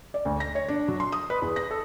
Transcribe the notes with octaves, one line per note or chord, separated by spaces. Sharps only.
D5
D2
A#6
C#5
D4
F#3
C6
D#6
B4
E2
A#6
A4